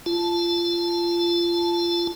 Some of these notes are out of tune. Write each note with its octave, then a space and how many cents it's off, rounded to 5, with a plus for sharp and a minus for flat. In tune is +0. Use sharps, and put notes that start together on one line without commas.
F4 -20 A5 -10